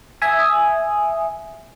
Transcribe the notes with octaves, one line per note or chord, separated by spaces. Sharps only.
E5 G#5 D#6